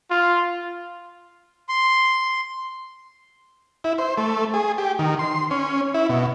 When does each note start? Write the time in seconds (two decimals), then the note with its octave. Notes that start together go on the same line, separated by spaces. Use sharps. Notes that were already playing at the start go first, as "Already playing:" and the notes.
0.11 F4
1.69 C6
3.84 E4
3.98 C5
4.18 A3
4.54 G#4
4.78 G4
4.99 D#3
5.19 C6
5.51 C#4
5.94 E4
6.09 B2